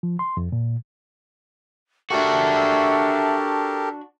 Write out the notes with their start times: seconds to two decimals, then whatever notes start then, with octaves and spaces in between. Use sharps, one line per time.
0.03 F3
0.19 C6
0.37 F2
0.52 A#2
2.10 D4 F#4 G4 A4 A#4 E5